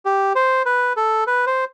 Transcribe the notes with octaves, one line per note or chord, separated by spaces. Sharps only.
G4
C5
B4
A4
B4
C5